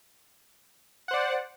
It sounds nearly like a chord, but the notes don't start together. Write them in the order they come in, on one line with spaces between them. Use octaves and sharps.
F#5 C5 D5